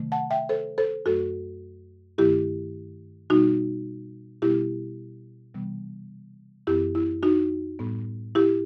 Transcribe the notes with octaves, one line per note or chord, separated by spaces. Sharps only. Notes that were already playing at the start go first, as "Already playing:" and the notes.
Already playing: C3 D#3 F#3 A3
F#5 A5
E5 G5
A4 C5
A4 C5
F#2 F#3 A3 F#4 A4
G2 D#3 A3 E4 G4
B2 G3 B3 D#4 F#4
B2 G3 B3 E4 G4
C3 E3 G3 B3
F#2 E3 B3 E4 G4
E4
D#4 F#4
A2 G3 B3
E4 G4